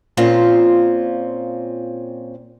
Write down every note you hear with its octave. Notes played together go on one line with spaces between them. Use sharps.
A#2 C4 C#4 F4